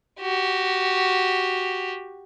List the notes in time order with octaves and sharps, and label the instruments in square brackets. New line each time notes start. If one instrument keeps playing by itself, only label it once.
[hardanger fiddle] F#4 G4